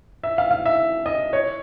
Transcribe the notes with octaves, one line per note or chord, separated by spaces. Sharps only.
E5
F5
F5
E5
D#5
C#5